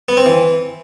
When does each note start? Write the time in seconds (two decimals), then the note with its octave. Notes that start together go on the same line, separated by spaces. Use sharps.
0.09 B3
0.17 C4
0.26 E3